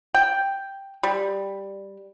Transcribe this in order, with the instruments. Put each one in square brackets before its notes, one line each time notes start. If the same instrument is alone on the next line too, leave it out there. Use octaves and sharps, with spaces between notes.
[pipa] G5
G3